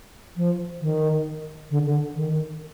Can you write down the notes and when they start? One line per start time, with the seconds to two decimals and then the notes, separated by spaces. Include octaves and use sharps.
0.37 F3
0.81 D#3
1.71 D3
1.86 D3
2.15 D#3